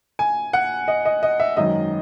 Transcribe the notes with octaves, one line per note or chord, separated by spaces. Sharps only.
G#5
F#5
D#5
D#5
D#5
E5
G#1 F#2 D#3 D#5